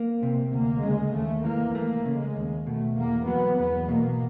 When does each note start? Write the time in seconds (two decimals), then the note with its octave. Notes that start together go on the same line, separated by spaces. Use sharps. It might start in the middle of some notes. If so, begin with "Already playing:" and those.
Already playing: A#3
0.22 C3 C4
0.53 D2 A#3
0.83 C#3 G#3
1.14 D#2 A3
1.44 E3 A#3
1.75 A3 A#3
2.06 C#3
2.20 G#3
2.36 D#2
2.67 B2 A3
2.97 E2 A#3
3.27 F#3 B3
3.58 E2 B3
3.89 B2 A#3